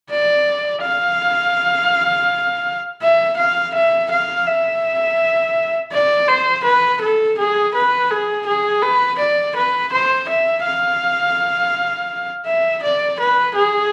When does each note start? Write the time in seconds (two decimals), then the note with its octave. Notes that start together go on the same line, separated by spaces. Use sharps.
0.10 D5
0.82 F5
3.02 E5
3.37 F5
3.74 E5
4.11 F5
4.46 E5
5.92 D5
6.28 C5
6.64 B4
7.02 A4
7.38 G#4
7.75 B4
8.11 G#4
8.46 G#4
8.82 B4
9.19 D5
9.56 B4
9.93 C5
10.29 E5
10.65 F5
12.46 E5
12.83 D5
13.20 B4
13.55 G#4